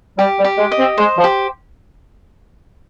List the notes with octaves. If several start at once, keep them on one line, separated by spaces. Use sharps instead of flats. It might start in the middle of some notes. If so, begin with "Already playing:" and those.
G3 G4
G3
G4
G#3
D#5
C4
G#3 C5
F3
G4